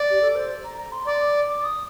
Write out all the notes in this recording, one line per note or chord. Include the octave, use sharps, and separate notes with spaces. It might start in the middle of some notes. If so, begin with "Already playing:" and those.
Already playing: D5
G4
A4
C5
A#5
A#5
C6
D5 D6
D#6